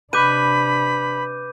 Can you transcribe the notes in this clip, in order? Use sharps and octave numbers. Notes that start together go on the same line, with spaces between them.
C3 D4 B4 B5 D6 G6 D#7